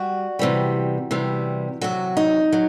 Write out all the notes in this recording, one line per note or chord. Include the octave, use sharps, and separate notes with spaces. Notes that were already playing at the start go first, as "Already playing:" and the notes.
Already playing: G3 F#4
C3 E3 G3
C3 E3 G3
C3 F#3 F#4
D#4
F#3